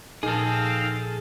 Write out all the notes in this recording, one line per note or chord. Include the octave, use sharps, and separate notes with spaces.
A#2 F3 C4 D#4 G#4 A4 D#5 F5